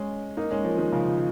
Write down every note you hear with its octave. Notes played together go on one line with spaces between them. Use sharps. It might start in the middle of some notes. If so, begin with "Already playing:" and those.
Already playing: G#3 C#4
A#3 D#4
G#3 C#4
F3 A#3
D#3 G#3
C#3 F3